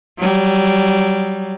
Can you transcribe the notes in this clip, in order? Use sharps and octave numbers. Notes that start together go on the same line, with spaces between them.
F#3 G3